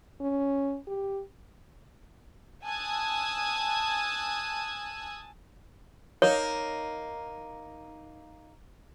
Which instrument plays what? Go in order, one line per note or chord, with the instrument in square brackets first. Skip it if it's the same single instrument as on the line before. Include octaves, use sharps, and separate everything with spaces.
[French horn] C#4
G4
[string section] G#5 A5 D#6 E6 F#6 G#6
[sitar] A#3 D#4 [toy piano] C#5